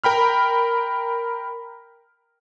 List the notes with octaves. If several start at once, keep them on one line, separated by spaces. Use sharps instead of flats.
A#4 G5 B5 F6